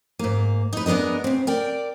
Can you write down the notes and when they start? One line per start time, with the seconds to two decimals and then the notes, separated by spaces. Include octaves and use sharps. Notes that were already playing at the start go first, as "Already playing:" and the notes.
0.19 G#2 A#3
0.73 D#4 B4
0.86 G#3 B3 D4 A#4 D#5
1.24 C#3 C4
1.47 A#4 D5 G5